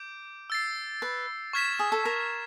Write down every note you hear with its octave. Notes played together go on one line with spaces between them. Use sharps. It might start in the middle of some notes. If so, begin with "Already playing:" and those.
Already playing: D6 G6 D7
E6 A6 C7
B4
C#6 F6 G#6 B6 E7
G#4
A4
A#4